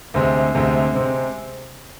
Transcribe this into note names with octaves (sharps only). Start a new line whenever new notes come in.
D2 C3 G#3 C4
D2 C3 G#3 C4
C3 G#3 C4